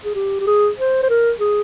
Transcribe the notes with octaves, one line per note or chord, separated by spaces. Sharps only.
G#4
G4
G4
G#4
C5
C5
A#4
G#4